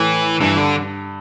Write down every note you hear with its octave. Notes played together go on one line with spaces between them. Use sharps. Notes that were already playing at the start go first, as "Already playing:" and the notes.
Already playing: A2 E3
G2 E3
D3